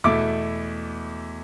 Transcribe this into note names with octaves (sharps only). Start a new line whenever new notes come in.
E2 B2 A3 E4 D6